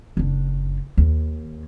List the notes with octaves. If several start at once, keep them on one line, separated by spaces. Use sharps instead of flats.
F#1 D4
D#2